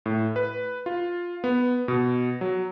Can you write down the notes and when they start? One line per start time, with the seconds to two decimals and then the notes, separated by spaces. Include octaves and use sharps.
0.06 A2
0.36 B4
0.86 F4
1.44 B3
1.88 B2
2.41 F#3